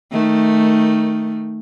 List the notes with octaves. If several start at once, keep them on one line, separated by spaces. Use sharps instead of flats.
D#3 A3